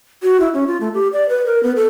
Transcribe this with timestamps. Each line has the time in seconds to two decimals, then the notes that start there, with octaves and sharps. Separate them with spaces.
0.23 F#4
0.40 E4
0.54 C#4
0.67 F4
0.81 A3
0.94 G4
1.13 D5
1.29 B4
1.46 A#4
1.63 B3
1.76 A4